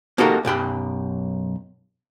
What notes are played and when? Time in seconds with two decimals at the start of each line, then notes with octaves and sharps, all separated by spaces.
0.18 A#3 D#4 F#4 G4 A4 A#4
0.45 B1 F#2 G4 B5